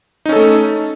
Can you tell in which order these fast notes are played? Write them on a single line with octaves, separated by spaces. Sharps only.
D#4 C#4 A4 A3